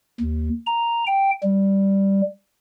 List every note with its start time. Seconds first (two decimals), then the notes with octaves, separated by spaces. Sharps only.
0.21 D#2
0.66 A#5
1.07 G5
1.43 G3